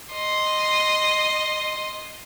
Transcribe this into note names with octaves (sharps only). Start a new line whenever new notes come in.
D#5 C6